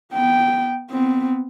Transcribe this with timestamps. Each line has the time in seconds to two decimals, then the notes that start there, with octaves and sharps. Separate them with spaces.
0.13 B3 G5
0.91 B3 C4